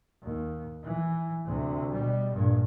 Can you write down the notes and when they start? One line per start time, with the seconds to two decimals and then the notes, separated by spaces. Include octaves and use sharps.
0.23 D#2
0.84 E3
1.46 D2 C3
1.94 B2 G3
2.34 A#1 G2